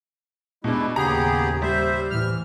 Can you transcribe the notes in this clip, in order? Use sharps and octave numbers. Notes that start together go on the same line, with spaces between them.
B2 G#3 D4 E4
D#2 A2 C#3 B3 G4 G#4 A#5
G3 C5 E5
A2 E3 F6